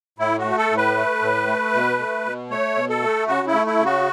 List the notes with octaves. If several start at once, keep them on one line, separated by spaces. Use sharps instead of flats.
A2 E4
F#4
A3
A4
A2
B4
A3
A2
A3
B2
A3
B2
A3 C#5
B2
A4
A3
C#3 F#4
E4
A3
E4
C#3
F#4